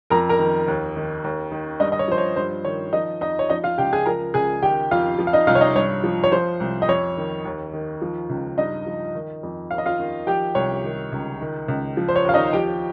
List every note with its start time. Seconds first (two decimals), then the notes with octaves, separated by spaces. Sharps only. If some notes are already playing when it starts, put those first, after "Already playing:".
0.10 F2 A#4 A#5
0.29 A#4 A#5
0.39 D#3
0.68 D#2
0.96 D#3
1.24 D#2
1.52 D#3
1.80 G2 D#4 D#5
1.92 D#5
1.99 C#5
2.08 F3 C5
2.18 C#5
2.36 G2 C5
2.65 D#3 C#5
2.93 F3 D#4 D#5
3.21 F2 D#4 D#5
3.39 C#5
3.50 F3 D#4 D#5
3.64 F4 F5
3.78 C#2 G4 G5
3.93 G#4 G#5
4.06 F3 A#4 A#5
4.34 C#2 G#4 G#5
4.63 D#3 G4 G5
4.91 F2 F4 F5
5.19 F3
5.27 F5
5.33 D#4 D#5
5.47 C2 F4 F5
5.55 C#5
5.61 D#4 D#5
5.75 G2 C#5
6.04 F3
6.24 C#5
6.32 F3 C5
6.60 C2
6.82 D#5
6.88 F2 C#5
7.17 D#3
7.45 D#2
7.73 D#3
8.02 F3
8.30 C#2
8.57 G2 D#4 D#5
8.87 F3
9.15 D#3
9.43 F2
9.71 D#2 F5
9.78 D#5
9.86 F4 F5
9.99 D#3
10.27 F3 G4 G5
10.55 C2 C#5
10.84 D#3
11.12 C#2
11.41 D#3
11.68 C#2
11.97 F3
12.08 C5
12.16 C#5
12.25 D#2 F5
12.34 D#4 D#5
12.53 F3 G4 G5